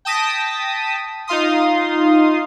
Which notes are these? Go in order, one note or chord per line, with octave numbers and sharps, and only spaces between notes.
G5 A5 D#6 A#6 B6
D#4 F4 F5 C6 D#6